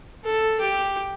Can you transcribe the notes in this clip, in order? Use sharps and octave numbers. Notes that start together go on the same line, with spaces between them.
A4
G4